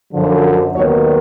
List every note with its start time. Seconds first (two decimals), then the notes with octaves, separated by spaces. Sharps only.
0.13 F#2 D3 F3
0.74 D#2 D#3 F#3 B3 C#5